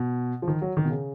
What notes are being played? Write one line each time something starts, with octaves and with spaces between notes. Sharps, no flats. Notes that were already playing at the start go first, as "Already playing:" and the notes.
Already playing: B2
F3
D#3
F#3
D#3
B2
C#3